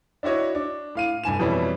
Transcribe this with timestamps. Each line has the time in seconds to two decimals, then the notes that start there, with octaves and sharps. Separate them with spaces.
0.23 D4 E4 F#4 C#5 D#5
0.55 D4
0.95 A2 F5 D#7
1.23 F1 G2 G#5 E7
1.39 F2 B2 E3 G3 C#4 E4